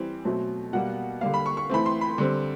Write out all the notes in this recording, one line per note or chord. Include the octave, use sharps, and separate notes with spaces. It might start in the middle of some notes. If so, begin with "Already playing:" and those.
Already playing: E3 G3 C4
B2 F#3 A3 C4
B2 G3 A#3 F#5
D3 G3 A#3 F5
B5
C#6
C#6
E3 A3 C4 B5
C6
B5
D3 G3 C4